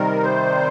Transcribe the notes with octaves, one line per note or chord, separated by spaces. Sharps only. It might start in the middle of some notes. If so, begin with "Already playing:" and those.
Already playing: C3 D#3 G3 A#4
C5